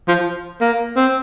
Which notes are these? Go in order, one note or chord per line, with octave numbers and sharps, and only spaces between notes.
F3
A#3
C4